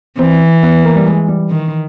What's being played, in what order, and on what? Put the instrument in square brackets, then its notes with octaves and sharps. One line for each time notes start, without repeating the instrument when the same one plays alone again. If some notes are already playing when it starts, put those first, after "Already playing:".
[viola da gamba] E3 [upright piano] C4
[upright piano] B3
A#3
G3
G#3
G3
[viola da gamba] D#3